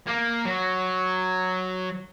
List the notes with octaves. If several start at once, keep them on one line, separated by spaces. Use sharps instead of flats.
A#3
F#3